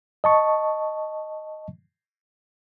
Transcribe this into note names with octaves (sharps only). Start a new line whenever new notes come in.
D#5 A5 C#6